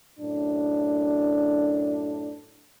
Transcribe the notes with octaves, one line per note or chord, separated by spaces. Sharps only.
F#2 A2 D4